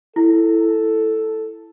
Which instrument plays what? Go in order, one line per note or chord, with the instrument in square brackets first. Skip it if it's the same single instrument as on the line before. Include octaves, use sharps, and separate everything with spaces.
[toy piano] E4 [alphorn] A4